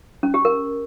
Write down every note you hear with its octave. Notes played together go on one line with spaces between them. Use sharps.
C#4
G4
A#4